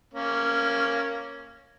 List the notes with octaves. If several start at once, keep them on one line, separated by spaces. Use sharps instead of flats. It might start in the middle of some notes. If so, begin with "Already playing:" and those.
A#3 C#4